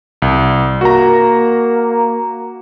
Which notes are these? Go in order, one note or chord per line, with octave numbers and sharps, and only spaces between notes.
C2
A#3 F#4 A#5